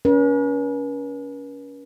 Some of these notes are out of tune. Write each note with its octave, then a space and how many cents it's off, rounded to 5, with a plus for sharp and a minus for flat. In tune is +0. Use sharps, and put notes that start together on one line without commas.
C#4 +25 B4 -45